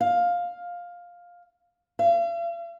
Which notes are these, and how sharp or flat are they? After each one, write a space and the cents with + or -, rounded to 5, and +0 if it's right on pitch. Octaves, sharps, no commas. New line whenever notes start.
F5 +10
F5 -45